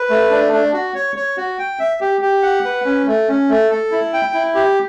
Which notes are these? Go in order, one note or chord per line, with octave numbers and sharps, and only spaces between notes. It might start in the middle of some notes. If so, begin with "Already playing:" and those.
Already playing: B4
A3
D4
D4
F#4
C#5
C#5
F#4
G5
E5
G4
G4
F#5
B4
C#4
A3
C#4
A3
A4
E4
G5
E4
G4